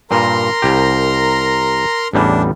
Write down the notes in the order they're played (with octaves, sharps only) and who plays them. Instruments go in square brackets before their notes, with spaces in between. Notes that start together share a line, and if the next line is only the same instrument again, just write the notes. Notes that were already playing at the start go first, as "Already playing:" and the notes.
[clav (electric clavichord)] G2 A#2 [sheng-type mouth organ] A#4 A#5 C6
[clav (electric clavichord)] C2 G4
[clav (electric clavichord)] A1 E2 G3 [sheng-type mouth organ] D4